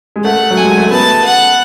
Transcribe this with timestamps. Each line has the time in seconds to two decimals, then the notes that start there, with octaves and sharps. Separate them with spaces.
0.16 G#3
0.24 A3 F#5
0.51 F#3
0.57 G#5
0.63 G#3
0.77 A3
0.91 B3 A5
1.24 F#5